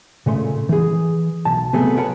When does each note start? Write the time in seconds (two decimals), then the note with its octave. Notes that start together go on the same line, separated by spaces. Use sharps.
0.26 A#2 C#3 A3 C6
0.69 E3 G#4
1.45 B1 A5
1.73 C3 F#3 A3 B3 G#4
1.97 A#4 B4 C#5 F#5 A5 B5